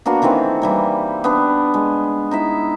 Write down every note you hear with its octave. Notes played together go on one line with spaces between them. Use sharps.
A#3 B3 D4 F#4
D#3 E3 A3 C4
E3 G3 A#3
B3 D4
G#3
D#4 E4 E5